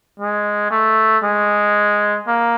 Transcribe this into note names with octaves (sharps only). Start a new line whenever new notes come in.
G#3
A3
G#3
A#3